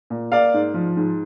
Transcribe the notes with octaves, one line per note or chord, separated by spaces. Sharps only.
A#2
A#3 D5 F5
G#2
F3
G#2